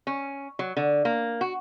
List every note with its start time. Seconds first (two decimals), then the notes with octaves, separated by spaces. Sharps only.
0.07 C#4
0.59 F#3
0.77 D3
1.05 A#3
1.41 F#4